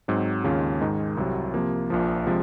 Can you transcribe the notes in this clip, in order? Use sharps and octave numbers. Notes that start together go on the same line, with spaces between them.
G#2 F#3 C4
D#2 C#3 G#3 C#4 F4
G#2 D#3 G#3 D#4
C2 C3 F#3
C3 F3 A#3
A#1 A#2 F3
C3 F3 G#3